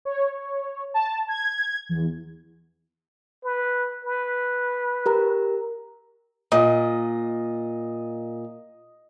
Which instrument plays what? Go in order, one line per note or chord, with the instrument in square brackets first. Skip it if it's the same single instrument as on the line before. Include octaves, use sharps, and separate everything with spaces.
[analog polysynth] C#5
A5
G#6
E2
[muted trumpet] B4
B4
[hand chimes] G4 A#4 A#5
[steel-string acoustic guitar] A#2 [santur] D#5